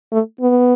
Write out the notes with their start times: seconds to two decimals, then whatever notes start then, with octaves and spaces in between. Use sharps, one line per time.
0.12 A3
0.41 B3